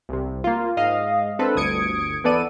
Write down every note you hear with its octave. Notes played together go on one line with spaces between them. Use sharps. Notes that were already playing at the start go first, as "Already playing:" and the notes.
C2 C3
A#3 F4
G#2 D#5 F5
C4 D4 A4 B4
G1 D2 D#6 G#6 C#7 D7
E3 B3 A4 D5 D#7